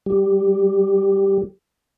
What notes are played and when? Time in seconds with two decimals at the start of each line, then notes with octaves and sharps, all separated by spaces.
0.06 G3 G4